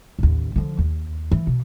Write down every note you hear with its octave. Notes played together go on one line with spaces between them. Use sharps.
A1 D#2
D3 F3
D#2
E3
B2